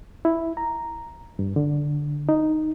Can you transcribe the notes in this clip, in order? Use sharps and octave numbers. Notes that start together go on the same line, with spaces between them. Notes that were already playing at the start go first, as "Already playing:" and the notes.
E4
A#5
G2
D3
D#4